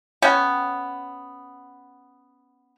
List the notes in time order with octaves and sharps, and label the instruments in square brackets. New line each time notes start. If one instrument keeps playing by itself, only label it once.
[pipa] B3 C#4 G5